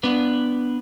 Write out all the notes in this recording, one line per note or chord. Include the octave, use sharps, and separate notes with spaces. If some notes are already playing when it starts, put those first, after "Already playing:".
B3 D4 B4